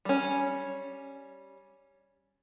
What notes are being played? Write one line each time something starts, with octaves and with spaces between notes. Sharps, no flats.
G3 C#4